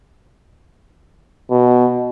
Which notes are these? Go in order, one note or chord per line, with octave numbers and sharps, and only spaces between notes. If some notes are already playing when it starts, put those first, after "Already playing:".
B2